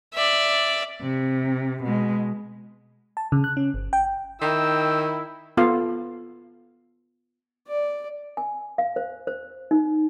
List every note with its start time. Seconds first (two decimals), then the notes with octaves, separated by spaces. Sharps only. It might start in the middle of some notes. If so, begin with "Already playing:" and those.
0.14 D5 E5
1.01 C3
1.83 B2 G#3
3.17 A5
3.32 C#3
3.44 F#6
3.57 C#4
3.74 G1
3.93 G5
4.42 D#3 E4 G5 E6
5.57 B3 F4 A4 F5
7.68 D5
8.37 G#5
8.78 F5
8.96 C5
9.27 C5
9.71 D#4